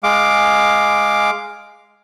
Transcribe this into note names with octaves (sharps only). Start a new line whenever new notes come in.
G#3 F5 D6